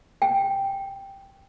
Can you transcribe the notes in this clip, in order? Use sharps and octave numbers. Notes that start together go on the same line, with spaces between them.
G5